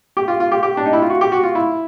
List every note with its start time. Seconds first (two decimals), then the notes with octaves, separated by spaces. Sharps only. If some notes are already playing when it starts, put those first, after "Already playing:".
0.17 G4
0.28 F4
0.40 F4
0.52 G4
0.63 G4
0.77 D4
0.86 D#4
0.93 E4
1.02 F4
1.10 F#4
1.21 G4
1.32 F#4
1.43 F4
1.55 E4